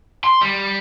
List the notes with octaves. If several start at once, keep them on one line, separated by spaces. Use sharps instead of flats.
C6
G3